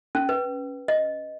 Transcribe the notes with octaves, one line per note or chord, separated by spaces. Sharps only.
C#4
B4
D#5